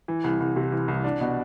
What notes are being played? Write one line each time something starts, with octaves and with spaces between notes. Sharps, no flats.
E3
C2
C2
C3
E3
C2
D4
B2